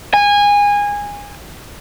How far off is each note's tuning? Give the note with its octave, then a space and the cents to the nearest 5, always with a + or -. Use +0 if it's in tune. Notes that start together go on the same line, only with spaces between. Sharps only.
G#5 -20